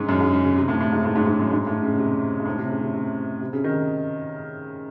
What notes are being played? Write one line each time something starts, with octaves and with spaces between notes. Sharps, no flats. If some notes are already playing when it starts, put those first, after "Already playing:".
Already playing: G#2 C#3
F#2
G#2
C#3
C#3
C3
A2
A2
G#2
A2
G#2
G#2
F#2
G#2
A2
C#3
C3
G#2
A2
C3
C#3
C#3
C3
C3
C#3
D#3